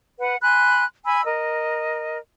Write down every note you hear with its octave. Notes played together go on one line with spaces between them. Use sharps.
B4 F#5
G#5 B5 C6 F#6
G#5 B5 E6
A#4 D#5